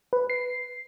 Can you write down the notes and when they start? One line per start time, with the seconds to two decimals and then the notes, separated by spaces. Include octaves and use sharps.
0.13 B4
0.30 C7